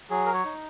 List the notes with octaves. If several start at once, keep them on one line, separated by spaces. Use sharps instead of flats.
F#3 G#4
A#4
C#5
D#4